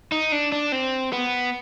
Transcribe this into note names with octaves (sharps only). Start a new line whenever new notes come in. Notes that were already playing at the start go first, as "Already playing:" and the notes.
D#4
D4
D4
C4
B3